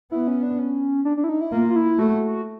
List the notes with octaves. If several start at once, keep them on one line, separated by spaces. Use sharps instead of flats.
B3 E4
C#4
D4
C#4
D4
D4
E4
D#4
E4
A#3 F4
F4
E4
A3 F#4